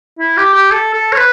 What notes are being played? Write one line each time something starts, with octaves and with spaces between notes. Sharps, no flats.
E4
G4
G4
A4
A4
C#5
B4